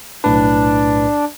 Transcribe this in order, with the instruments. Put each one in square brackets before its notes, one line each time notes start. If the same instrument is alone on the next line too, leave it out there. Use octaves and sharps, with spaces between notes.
[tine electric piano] B1 A2 B4 [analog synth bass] D4